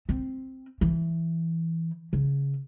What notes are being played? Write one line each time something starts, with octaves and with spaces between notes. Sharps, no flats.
C4
E3
C#3